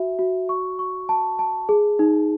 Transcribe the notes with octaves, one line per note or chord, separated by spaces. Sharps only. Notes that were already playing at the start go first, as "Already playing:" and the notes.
Already playing: F#4 E5
F#4
C#6
C#6
A5
A5
G#4
D#4